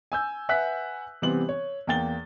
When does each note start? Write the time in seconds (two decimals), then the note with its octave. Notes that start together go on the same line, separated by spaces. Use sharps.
0.12 G#5 E6 G6
0.49 B4 E5 F#5 G#5 F#6 B6
1.22 C3 E3 G3 B3 C4 F#7
1.49 C#5
1.87 E2 A#3 G5 A6 G7